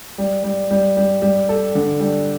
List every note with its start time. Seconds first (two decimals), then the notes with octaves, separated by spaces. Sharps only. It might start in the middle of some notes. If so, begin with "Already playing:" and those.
0.18 G3
0.44 G3
0.71 G3
0.97 G3
1.22 G3
1.49 A4
1.75 D3
2.00 G3